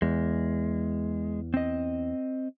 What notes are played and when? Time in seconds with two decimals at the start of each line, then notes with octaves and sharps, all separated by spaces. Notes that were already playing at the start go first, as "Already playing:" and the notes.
0.02 E2 G#3
1.54 C4 D#5